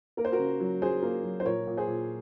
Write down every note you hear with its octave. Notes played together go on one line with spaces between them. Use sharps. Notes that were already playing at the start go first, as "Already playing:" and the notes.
A#3 A#4
C5
F#4 A#4
C#3
F#3
F#3 G#4 C5
A#3
F#3
C5
A#2 A#4 C#5
A#2
G#4 C5
A#2